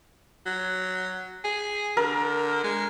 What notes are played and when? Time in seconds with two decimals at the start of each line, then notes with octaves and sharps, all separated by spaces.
0.46 F#3
1.44 G#4
1.97 D3 A#4
2.64 G#3